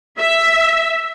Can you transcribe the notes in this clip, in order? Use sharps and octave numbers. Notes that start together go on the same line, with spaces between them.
E5